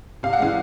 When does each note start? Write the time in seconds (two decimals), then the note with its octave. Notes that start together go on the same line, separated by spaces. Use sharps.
0.23 C3 F5
0.33 F#5
0.39 E3 G#3 F5